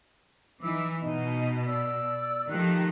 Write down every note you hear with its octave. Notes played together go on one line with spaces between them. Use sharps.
E3 D#4 D6 E6
B2 D#4 D#5
D5 E6
D#3 F3 A3 G4 D#5 F#6